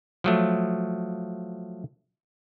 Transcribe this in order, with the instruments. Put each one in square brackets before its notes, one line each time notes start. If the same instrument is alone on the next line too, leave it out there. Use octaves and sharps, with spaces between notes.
[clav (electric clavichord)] F3 F#3 A3